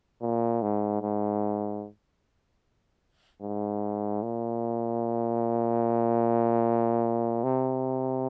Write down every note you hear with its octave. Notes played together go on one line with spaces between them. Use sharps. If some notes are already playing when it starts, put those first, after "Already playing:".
A#2
G#2
G#2
G#2
A#2
C3